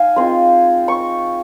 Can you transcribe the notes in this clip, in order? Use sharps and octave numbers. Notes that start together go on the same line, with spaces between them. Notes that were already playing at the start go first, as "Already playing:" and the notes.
Already playing: D#4 F5 G#5
G#3 C4 F4 C6
C#6